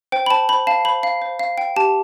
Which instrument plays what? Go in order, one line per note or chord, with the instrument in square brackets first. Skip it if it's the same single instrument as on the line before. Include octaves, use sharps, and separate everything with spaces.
[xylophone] C5 G5
B5
C5 A5
C5 B5
F5 A5
C5 B5
F5
C5
F5
G5
G4 A5